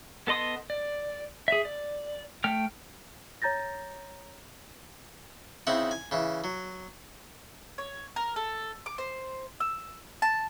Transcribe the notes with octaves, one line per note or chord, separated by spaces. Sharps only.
B3 A4 D#5 C6 D#6
D5
G#4 E5
D5
A3 G5 F6
C#5 A#5 G6 A6 A#6
C#3 C4 D#4 E4 F#5
G#5
C#3 E3
F#3
C#5
A#4
A4
D6
C5
E6
A5